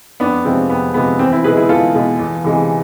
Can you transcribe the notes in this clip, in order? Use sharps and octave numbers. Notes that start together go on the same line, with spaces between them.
F2 B3 D4
C3 F3 G#3 C4
F2 B3
C3 F3 G#3 B3
E2 C4
C4 E4
B2 G#3 G#4 B4
E4 G#4
E2 F4 A4
B2 G#3
E2
C3 E3 G#3